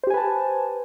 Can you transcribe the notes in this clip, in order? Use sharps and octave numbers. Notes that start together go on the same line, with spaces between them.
G4 B4 C5 G#5 A5